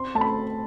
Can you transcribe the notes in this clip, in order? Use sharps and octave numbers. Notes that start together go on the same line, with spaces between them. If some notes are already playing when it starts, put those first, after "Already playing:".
Already playing: C4 C6
A3 A5
B5